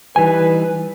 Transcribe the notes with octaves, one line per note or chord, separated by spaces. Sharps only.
E3 G3 D#4 B4 G#5